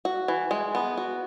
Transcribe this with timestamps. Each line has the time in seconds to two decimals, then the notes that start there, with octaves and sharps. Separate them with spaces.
0.05 F#4
0.28 E3
0.51 G#3
0.75 B3
0.97 F#4